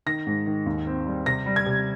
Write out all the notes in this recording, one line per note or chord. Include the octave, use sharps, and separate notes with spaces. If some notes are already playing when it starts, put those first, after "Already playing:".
D#3 A#6
G#2
D#3
D#2
C4
G3
C3 A#6
G3
G#6
C3